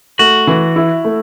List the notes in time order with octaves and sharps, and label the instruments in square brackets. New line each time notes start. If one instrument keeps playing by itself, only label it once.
[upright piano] A3 [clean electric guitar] F#4
[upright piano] E3
E4
A3